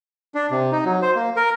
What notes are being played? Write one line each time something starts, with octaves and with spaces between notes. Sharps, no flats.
D4
C3
D#4
F#3
C5
A#3
A#4